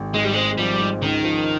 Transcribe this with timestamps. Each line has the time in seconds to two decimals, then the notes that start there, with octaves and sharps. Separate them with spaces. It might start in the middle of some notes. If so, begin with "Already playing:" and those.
Already playing: G#1
0.14 G#2 G#3
0.23 G3
0.33 G#3 C4
0.58 F3 G3
0.79 G#2
1.02 C#2 D#3
1.24 F3